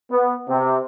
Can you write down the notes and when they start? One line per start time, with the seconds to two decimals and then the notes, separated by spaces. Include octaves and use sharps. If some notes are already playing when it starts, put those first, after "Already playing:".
0.12 B3
0.48 C3